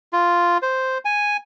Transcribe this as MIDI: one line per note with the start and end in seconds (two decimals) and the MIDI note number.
0.13 0.58 65
0.62 0.98 72
1.05 1.37 80